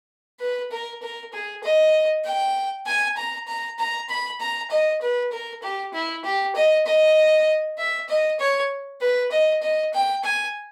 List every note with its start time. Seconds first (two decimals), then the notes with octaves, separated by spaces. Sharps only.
0.40 B4
0.71 A#4
1.02 A#4
1.33 G#4
1.63 D#5
2.25 G5
2.86 G#5
3.16 A#5
3.47 A#5
3.79 A#5
4.09 B5
4.40 A#5
4.70 D#5
5.01 B4
5.32 A#4
5.62 G4
5.93 E4
6.24 G4
6.56 D#5
6.86 D#5
7.78 E5
8.09 D#5
8.39 C#5
9.01 B4
9.31 D#5
9.62 D#5
9.93 G5
10.24 G#5